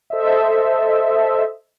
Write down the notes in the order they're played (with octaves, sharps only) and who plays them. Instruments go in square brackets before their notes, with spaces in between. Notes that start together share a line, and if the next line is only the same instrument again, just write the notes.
[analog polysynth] A4 C5 D#5 E5